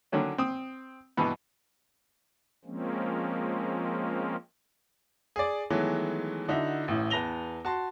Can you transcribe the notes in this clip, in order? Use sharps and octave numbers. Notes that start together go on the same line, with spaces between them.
D3 D#3 F#3 C#4
C4 D#6
G2 B2 E3 B3
F3 G#3 A#3 C4 C#4
G#4 D5
D#3 E3 F#3 G#3 A3 B3
D3 D#4 E4 F#4 E5
A1 A2
E2 B4 A5 A#6 F7 G7
F#4 A5 C6